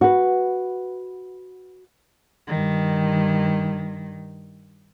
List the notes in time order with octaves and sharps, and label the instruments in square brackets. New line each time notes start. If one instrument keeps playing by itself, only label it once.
[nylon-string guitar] F#4 B4
[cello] G2 D#3